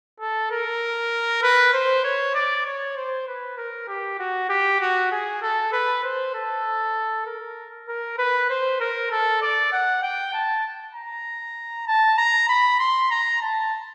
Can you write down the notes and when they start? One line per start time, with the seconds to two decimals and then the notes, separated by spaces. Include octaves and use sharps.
0.20 A4
0.51 A#4
1.43 B4
1.73 C5
2.04 C#5
2.35 D5
2.65 C#5
2.96 C5
3.27 B4
3.58 A#4
3.88 G4
4.19 F#4
4.50 G4
4.80 F#4
5.12 G#4
5.42 A4
5.72 B4
6.04 C5
6.34 A4
7.26 A#4
7.88 A#4
8.18 B4
8.50 C5
8.80 A#4
9.11 A4
9.42 D5
9.72 F#5
10.03 G5
10.33 A5
10.95 A#5
11.87 A5
12.18 A#5
12.49 B5
12.79 C6
13.11 A#5
13.41 A5